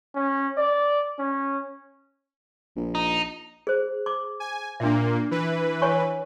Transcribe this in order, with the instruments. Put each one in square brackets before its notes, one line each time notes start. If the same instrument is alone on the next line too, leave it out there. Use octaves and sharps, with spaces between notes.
[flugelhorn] C#4
D5
C#4
[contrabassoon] A#1
[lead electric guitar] D#4
[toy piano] G#4 C5
D6
[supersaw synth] G#5
[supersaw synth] A#2 A#3 [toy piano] D4 E5
[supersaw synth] E3 B4
[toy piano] C#5 G#5 C#6